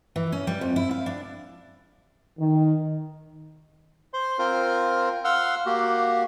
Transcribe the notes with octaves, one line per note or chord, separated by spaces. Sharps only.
E3
C#4
G3
F2
E4
F5
D4
D#3
C5 C6
C4 F4 A#4 C5
F5 F#5 C6 E6 F6
A#3 F#4 G4